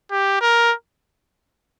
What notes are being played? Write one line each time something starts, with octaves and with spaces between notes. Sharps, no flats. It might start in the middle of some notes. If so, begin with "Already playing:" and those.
G4
A#4